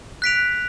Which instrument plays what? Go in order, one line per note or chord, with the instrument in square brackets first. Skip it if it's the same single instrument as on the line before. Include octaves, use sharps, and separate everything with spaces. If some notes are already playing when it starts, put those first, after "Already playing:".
[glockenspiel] F#6 B6 D7 F7